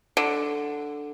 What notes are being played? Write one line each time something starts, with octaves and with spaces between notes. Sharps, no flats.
D3